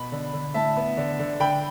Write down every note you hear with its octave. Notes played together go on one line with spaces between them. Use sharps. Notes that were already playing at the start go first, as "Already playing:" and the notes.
Already playing: B2 B5
D3
D3
A2 E5 A5
B3
D3
D3
D3 G5 B5